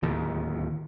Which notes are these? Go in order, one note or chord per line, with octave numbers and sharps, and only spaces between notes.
D1 D#2 D#3